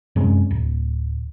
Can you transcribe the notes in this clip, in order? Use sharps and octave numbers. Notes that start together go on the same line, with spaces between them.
F#2 C3 G#3 C#4
D1